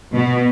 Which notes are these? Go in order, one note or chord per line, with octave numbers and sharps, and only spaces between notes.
B2